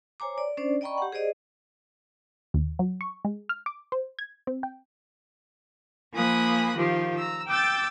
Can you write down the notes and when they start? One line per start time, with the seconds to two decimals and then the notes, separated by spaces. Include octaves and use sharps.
0.20 C5 C#5 G#5 A#5 D6
0.38 D5
0.57 C#4 D4 C5 D5
0.81 D5 D#5 G5 A#5 B5 C#6
0.98 G4 F#5
1.12 G#4 C5 D5 D#5
2.54 D#2
2.79 F#3
3.01 C#6
3.25 G#3
3.49 F6
3.66 D6
3.92 C5
4.19 G#6
4.47 C4
4.63 G5
6.13 F3 A#3 G#5 B5 D#6 F#6
6.76 D#3 F3 F4 G4
7.17 A#5 E6
7.48 G5 D6 E6 G6 A6